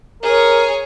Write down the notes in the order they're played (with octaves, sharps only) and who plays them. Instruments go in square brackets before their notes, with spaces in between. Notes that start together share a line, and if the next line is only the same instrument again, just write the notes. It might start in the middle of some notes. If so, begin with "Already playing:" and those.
[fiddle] G#4 C#5 [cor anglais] A#4